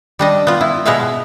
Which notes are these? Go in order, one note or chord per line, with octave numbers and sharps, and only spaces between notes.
G3 D4 D#5
B3 F4
E4
B2 G#3 B3 G#4 E5 F5